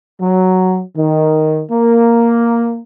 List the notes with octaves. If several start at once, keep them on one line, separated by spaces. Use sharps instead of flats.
F#3
D#3
A#3